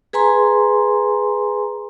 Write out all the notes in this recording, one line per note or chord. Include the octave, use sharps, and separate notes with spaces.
G#4 B4 G#5 A#5 C6